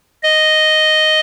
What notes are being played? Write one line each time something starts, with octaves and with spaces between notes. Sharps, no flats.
D#5